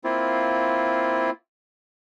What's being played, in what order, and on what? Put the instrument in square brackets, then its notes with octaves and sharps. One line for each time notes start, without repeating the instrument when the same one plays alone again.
[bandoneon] A#3 C4 E4 F4